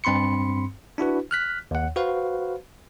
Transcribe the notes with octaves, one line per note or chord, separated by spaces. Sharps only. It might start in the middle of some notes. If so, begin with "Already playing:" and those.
G2 C4 B5 C6 C#7
D4 E4 F#4 B4
F6 F#6 B6
D#2 F#5
F#4 B4 C5 F5